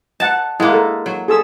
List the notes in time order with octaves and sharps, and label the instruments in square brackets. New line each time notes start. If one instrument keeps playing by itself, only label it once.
[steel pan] D#5 F#5 [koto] A5
[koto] G#3 A#3 [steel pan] E4 F#5 D#6
[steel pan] A4 A#4 A#5
[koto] F#3
[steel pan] G#4 A4 E6